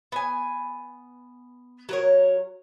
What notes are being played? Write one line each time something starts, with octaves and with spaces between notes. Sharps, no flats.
B3 G#5
F#3 A#4 C#5